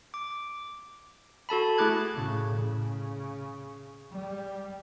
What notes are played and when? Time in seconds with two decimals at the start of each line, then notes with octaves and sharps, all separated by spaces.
0.14 D6
1.49 F#4 A4 A5 B5
1.78 A3 E4 G#4 D6 F#6 G#6
2.15 A2 C#3
2.55 C#3
4.12 G3